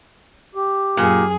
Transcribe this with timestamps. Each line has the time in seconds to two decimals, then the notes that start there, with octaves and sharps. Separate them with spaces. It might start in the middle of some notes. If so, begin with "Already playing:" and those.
0.55 G4
0.97 F#2 A#2 G#4